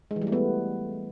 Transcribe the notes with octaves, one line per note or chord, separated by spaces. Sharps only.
G#3
E3
G3
A3
B3